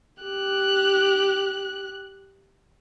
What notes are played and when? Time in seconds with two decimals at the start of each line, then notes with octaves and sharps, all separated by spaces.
0.23 G4 F#6